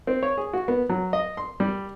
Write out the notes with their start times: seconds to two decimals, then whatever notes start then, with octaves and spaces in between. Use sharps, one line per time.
0.07 C4
0.23 C#5
0.38 G#4
0.53 F#4
0.68 B3
0.89 F#3
1.13 D#5
1.37 C6
1.60 G3